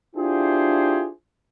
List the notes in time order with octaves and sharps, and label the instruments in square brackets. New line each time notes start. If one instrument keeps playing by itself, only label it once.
[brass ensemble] D4 E4 F4 G4 G#4 C5